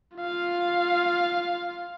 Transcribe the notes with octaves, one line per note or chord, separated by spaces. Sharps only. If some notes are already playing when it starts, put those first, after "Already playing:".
F4 F5